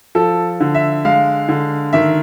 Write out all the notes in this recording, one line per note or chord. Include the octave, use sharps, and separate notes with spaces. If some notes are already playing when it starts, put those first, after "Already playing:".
F3 A4
D3
E5
G#3 F5
D3
D#3 E5